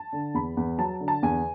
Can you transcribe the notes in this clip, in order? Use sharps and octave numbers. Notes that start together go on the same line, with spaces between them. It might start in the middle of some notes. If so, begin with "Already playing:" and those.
Already playing: A5
D3
E2 B5
E2
F#3 A5
D3
A5
E2 G#5